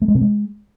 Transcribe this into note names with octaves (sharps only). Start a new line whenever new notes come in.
A3
G#3
C3
G#3